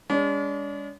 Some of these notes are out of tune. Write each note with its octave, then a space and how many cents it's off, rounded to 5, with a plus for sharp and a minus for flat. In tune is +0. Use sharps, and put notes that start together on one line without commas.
G#3 -40 D4 -45